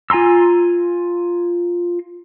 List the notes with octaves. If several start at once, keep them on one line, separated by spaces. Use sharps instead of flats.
F4 G#5 A#5 C6 E6